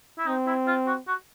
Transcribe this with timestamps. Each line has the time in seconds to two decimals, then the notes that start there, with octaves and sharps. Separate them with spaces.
0.18 E4
0.26 C4 D#4
0.47 E4
0.67 F4
0.87 F#4
1.07 F#4